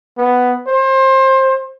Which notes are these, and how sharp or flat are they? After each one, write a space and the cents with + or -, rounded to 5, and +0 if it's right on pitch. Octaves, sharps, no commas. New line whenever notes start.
B3 +5
C5 +25